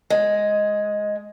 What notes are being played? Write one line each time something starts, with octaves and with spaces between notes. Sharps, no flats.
G#3